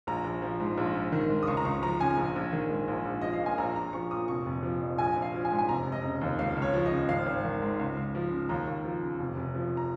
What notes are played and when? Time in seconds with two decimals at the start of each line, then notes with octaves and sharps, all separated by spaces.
0.07 A#1 A#5
0.25 A#1
0.42 F3
0.60 G#2
0.78 A#1
0.95 A#1
1.12 D#3
1.30 G#2
1.43 D#6
1.47 C#2 C#6
1.57 A#5
1.65 C#2 C#6
1.82 F3 A#5
2.00 C#3 G#5
2.17 A#1
2.36 A#1
2.53 D#3
2.70 G#2
2.88 A#1
3.05 A#1
3.21 F3 D#5
3.33 F5
3.41 A#2
3.46 G#5
3.58 A#1 A#5
3.76 A#1 A#5
3.93 F3 C#6
4.11 A#2 D#6
4.28 F1 C#6
4.46 F1
4.63 F3
4.81 F2
4.98 A#1 G#5
5.16 A#1
5.22 F5
5.34 F3
5.45 G#5
5.51 G#2
5.58 G#5
5.68 F1 A#5
5.86 F1
5.92 D#5
6.03 C#3
6.21 D#2
6.39 C#2 F5
6.56 C#2
6.62 C#5
6.74 F3
6.86 D#5
6.92 C#3
7.09 G#1 F5
7.26 G#1
7.44 D#3
7.62 G#2
7.79 C#2
7.97 C#2
8.15 F3
8.32 C#3
8.49 D#2 A#5
8.67 D#2
8.84 F3
9.02 C#3
9.19 F1
9.37 F1
9.55 F3
9.77 A#5